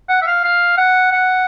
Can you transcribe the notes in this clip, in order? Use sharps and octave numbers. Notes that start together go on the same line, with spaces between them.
F#5
E5
F5
F5
F#5
F#5